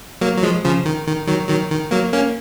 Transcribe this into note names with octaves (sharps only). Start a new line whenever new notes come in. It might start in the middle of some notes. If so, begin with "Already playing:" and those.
F#3 A#3
F#3
F3 G#3
C#3 F3
D#3
D#3
D#3 F#3
D#3 F#3
D#3
F#3 A#3
A#3 C#4